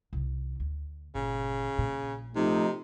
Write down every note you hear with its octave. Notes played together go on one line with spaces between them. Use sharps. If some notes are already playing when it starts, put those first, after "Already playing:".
C2 D#3
D2
G1 A#2 C#3
A#1 A#2
C3 F3 A3 D#4